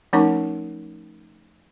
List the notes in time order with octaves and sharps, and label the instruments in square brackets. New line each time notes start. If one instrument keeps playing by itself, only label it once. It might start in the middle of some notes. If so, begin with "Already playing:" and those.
[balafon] F3 A3 C#4 D#4 A#4 C#6